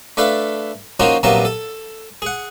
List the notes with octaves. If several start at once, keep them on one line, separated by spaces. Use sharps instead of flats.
A3 D4 A4 B4 F5
F3 A#3 C#4 D#4 F4 F#4
A#1 C3 F#3 A#3 B3 A5
A4
G#4 F#5